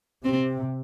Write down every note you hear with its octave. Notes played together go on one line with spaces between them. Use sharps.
C3 C4